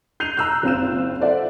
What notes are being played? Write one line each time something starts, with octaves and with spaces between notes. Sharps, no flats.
G6 C7 D#7 F7
A#5 E6 F#6
F#1 C4 F4 E7
F4 A4 C5 D5 E5 F#5